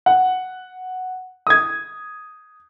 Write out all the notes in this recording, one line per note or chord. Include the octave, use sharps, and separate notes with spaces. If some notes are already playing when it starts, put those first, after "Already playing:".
F#5
D#6 G#6